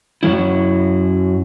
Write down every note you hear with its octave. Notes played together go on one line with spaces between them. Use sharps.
F#2 F#3 G3 E4